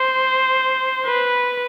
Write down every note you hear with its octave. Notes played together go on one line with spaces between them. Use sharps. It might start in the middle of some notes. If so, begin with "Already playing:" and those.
Already playing: C5
B4